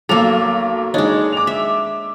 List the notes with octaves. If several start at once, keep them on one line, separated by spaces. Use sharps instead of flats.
B1 A#3 A4 D6 F7
G#3 D4 D#4 C#5
D6 F7
E5